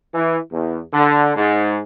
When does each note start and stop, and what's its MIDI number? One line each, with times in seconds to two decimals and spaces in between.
0.14 0.37 52
0.52 0.80 40
0.93 1.31 50
1.35 1.82 44